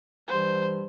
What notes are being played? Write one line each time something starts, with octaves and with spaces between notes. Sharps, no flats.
G2 E3 G3 C5